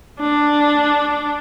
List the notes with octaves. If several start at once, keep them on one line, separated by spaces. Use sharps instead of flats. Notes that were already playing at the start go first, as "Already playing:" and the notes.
D4